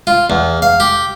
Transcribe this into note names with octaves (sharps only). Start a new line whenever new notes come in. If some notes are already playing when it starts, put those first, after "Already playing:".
F4
E2
F5
G4